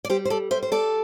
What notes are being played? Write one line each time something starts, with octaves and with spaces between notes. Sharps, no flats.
D5
G3 G4 C5
C5
A4 D5
G3 C5 E5
C5
A4 D5